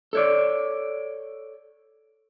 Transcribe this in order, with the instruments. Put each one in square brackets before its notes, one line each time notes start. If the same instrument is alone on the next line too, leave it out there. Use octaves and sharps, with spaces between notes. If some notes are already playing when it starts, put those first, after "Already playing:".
[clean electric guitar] A4 C#5 D5